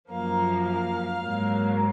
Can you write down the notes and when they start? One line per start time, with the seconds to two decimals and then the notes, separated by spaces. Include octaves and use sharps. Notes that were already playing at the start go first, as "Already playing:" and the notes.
0.11 F#2 F3 A#3 F5
0.66 F5
1.21 G#2 F#3 A#3